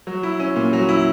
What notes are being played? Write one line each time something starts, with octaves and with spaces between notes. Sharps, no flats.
F#3
E4
C#4
A#2
F#3
E4